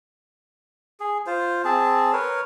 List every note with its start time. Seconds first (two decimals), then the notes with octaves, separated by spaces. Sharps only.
1.00 G#4
1.26 F4 C5
1.64 C4 G#4 A5
2.13 A#4 B4 C#5